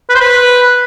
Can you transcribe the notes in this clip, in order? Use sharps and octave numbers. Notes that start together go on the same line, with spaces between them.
B4
C5
B4